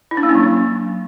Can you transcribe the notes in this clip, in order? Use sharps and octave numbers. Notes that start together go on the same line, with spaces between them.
E4
D4
A#3
C#4
F#3